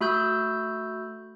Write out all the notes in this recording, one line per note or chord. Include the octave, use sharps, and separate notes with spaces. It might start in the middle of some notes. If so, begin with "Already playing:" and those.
A3 F#4 B5 E6 G6